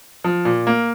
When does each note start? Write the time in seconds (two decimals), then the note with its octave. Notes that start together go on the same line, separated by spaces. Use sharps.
0.24 F3
0.45 A#2
0.67 A#3